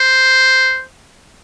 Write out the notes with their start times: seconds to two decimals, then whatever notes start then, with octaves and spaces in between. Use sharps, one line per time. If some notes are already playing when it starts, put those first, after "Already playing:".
Already playing: C5